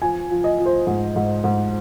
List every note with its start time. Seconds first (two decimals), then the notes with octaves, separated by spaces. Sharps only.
0.02 F3 G#5
0.31 F3
0.44 D#5
0.59 F3
0.66 C5
0.87 G#2
1.16 G#2
1.44 G#2